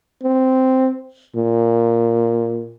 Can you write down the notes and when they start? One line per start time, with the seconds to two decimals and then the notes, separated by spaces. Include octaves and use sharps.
0.23 C4
1.36 A#2